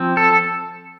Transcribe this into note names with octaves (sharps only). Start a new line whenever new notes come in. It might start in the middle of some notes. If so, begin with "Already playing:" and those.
Already playing: F3 C4
A4